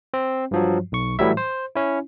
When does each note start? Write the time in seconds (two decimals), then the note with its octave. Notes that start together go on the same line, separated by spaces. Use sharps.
0.14 C4
0.51 G2 F3 F#3
0.92 B1 C#6
1.19 A2 E3 F#3 G3 E4 E5
1.37 C5
1.76 C#4 E4